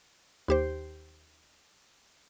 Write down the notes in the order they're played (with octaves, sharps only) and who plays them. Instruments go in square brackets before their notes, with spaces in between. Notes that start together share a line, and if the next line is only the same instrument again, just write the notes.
[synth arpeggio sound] D#2 G4 C5